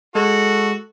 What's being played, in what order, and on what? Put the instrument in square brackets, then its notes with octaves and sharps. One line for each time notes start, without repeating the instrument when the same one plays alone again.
[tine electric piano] G#3 [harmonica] F#4 [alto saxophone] A4